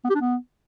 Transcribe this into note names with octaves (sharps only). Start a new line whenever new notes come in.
B3
G4
D4
B3